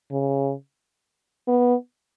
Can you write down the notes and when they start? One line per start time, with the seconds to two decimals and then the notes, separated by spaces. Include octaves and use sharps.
0.11 C#3
1.48 B3